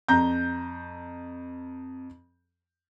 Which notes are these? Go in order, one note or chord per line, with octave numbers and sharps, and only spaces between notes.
F2 A#5 G6